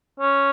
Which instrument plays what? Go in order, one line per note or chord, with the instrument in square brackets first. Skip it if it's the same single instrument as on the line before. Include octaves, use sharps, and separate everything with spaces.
[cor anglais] C#4